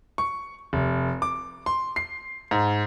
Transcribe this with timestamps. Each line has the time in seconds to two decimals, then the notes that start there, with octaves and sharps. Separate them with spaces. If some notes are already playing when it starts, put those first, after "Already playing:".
0.18 C#6
0.73 F1
1.22 D6
1.66 C6
1.96 C7
2.51 G#2